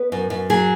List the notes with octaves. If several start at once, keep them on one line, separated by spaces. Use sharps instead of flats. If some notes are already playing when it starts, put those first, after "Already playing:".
Already playing: B3 B4
F#2
F#2
F#3 G#4